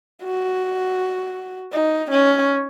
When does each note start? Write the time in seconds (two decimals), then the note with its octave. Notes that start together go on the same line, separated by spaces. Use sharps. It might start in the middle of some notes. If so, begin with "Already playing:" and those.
0.23 F#4
1.73 D#4
2.11 C#4